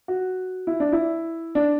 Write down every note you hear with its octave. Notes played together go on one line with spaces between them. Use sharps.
F#4
E4
D4
E4
D4